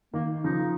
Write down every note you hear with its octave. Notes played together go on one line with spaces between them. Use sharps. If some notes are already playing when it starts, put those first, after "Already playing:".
D#3 A#3
C#3 F3 D#4